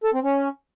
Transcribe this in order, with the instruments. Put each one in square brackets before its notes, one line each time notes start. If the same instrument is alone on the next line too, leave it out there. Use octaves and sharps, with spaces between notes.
[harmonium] A4
C4
C#4